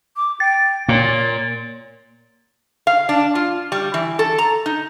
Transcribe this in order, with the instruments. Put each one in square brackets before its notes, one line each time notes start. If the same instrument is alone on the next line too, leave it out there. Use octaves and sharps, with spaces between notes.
[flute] D6
[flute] G5 [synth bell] A6
[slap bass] A#2 [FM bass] A#3 [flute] C#5
[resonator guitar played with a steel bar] F5
D4
F4
G3
E3
A4
A#5
D#4